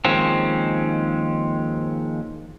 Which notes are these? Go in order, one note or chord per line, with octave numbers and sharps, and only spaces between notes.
D#2 D#3 F3 G#3 C4 C#4